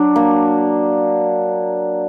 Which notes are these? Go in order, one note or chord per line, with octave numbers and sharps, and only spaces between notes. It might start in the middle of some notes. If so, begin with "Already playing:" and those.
Already playing: F#3 D4
A#3